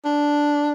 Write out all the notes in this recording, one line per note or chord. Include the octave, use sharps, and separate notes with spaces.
D4